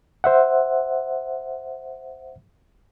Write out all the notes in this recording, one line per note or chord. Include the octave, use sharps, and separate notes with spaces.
C5 E5 F#5